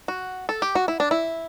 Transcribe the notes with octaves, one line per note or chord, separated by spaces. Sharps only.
F#4
A4
G4
F#4
E4
D4
E4